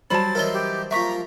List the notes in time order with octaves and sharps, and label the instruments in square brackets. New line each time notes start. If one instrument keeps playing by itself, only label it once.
[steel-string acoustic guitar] F#3 G3 C5 [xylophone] A5 B5 [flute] A6
[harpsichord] E3 D#4 E4 [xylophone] A#4 C#5 G7
[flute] G4
[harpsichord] F3 A#3 [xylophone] E5 C#6 B6 [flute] A#5